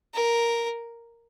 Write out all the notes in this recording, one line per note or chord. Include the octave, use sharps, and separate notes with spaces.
A#4